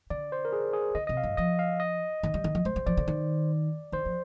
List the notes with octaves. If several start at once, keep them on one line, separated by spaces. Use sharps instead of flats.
D3 D5
C5
A#4
G#4
G#4
D3 D#5
C3 D#5
F5
G2
F3 D#5
F5
D#5
D#3
G3
D#3
F3
G#3 C5
G3
F3 D5
D3
D#3
D#3 C5
F3